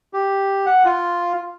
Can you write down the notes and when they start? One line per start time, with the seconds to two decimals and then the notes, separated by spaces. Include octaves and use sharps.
0.13 G4
0.66 F#5
0.85 F4